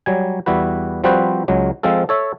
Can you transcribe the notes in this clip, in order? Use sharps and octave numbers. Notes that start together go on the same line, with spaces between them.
F#3 G3 G#5
E2 G3 E4 F#4 B4
F3 G3 C4 F#4 B4 C5
C#2 F#3 G#3
F3 G#3 C4 F4 A4
A4 C#5 E5